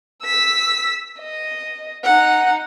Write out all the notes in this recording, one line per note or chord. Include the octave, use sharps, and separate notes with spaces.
E6 B6
D#5
D#4 F#5